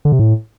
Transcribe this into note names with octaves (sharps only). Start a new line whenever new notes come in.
D3
C3
A2